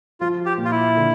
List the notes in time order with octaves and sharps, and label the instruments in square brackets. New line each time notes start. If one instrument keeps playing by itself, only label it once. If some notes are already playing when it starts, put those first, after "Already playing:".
[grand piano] F3 [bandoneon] F4
[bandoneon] G4
[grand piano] A#2
[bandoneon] F4
E4
[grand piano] D3